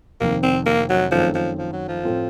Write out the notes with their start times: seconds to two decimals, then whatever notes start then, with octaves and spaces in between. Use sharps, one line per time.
0.20 F1 F2 D#3 A#3
0.43 C4
0.66 A#3
0.90 F#3
1.11 F#2 D#3 F3 A3 C4
1.35 F3
1.58 F3
1.73 F#3
1.88 F3
2.04 A2 A3 C4 F4